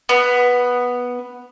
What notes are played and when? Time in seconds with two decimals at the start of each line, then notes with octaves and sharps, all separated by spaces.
0.09 B3